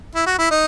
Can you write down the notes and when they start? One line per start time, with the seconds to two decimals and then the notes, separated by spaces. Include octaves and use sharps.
0.15 E4
0.26 F#4
0.39 E4
0.51 D#4